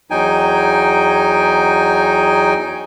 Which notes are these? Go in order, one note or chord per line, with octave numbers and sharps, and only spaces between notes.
E2 F#3 D#4 G5 G#5